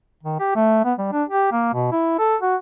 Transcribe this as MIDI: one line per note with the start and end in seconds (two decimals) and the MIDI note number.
0.23 0.39 51
0.40 0.50 67
0.55 0.81 57
0.85 0.93 59
0.98 1.08 55
1.12 1.24 62
1.29 1.50 67
1.52 1.72 58
1.73 1.91 47
1.92 2.17 64
2.19 2.36 69
2.42 2.56 66